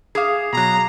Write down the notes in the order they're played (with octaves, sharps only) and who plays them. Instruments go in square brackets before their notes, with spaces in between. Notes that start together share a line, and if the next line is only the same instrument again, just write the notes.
[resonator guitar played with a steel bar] G#4 F5 [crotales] D6 D#6 C7
[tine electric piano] B2 F#3 [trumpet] A#5